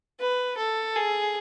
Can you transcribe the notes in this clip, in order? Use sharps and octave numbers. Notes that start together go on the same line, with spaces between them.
B4
A4
G#4